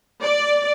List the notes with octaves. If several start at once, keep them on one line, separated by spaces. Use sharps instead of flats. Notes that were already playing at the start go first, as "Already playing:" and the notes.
D5